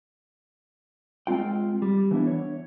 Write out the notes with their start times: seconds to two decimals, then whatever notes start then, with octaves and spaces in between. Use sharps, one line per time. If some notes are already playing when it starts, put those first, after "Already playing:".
1.27 G#3 C4 F4 G5
1.82 G3
2.11 E3 B3 D4 E4
2.27 C#5